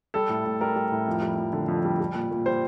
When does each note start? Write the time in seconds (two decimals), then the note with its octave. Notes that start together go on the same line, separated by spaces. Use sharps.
0.14 G3 A4
0.29 A2
0.45 A2
0.61 G3 A#4
0.76 G3
0.92 A2
1.08 F2
1.22 G3
1.38 F2
1.53 D3
1.68 F2
1.85 G3
2.00 G3
2.14 A#2
2.31 A#2
2.46 G3 C5